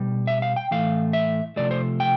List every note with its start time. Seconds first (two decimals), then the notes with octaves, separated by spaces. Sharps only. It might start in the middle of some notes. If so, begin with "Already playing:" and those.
Already playing: B2 G3
0.27 E5
0.42 F5
0.56 G5
0.71 A2 E3 A3 F5
1.13 E5
1.56 C3 F3 A3 D5
1.71 C5
2.00 G5